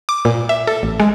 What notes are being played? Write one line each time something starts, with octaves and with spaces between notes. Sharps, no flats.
D6
A#2
E5
A4
A1
G#3